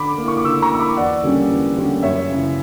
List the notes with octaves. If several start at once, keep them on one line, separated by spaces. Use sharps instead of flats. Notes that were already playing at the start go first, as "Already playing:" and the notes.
Already playing: D3 B5 D6
A#3 E4
C#6
D6
D3 C#6 E6
A#5 C#6
A#3 E4 E6
B5 D6
E2 D5 F#5
D3 G3 A#3 C#4
E2
D3 G3 A#3 C#4
F#2 C#5 E5
C#3 E3